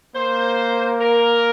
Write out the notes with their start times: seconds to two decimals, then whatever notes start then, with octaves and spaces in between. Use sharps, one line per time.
0.14 A#3 C5
1.00 A#4